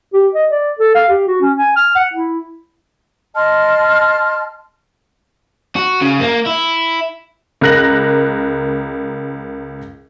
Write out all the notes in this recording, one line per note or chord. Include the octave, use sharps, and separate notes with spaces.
G4
D#5
D5
A4
F5
G4
F#4
C#4
G#5
F6
F#5
E4
D#5 A5 C6 F6
F#4
C#3
A#3
E4
C#2 A#4 F#6 A#6 F#7